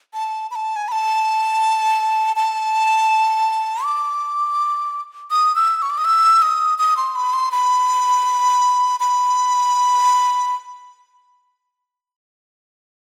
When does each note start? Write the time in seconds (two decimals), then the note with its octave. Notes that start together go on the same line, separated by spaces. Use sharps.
0.14 A5
0.51 B5
0.55 A5
0.76 G#5
0.88 B5
0.92 A5
2.36 A5
3.84 D6
5.31 D#6
5.56 E6
5.82 C#6
5.90 D6
5.98 D#6
6.05 E6
6.42 D#6
6.79 D#6
6.97 C6
7.15 B5
7.33 C6
7.52 B5
9.00 B5